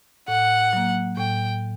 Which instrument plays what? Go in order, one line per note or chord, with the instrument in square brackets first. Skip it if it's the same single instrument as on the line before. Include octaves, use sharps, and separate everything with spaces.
[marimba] A2 [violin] F#5
[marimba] F#3 A#3
[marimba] A2 [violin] G5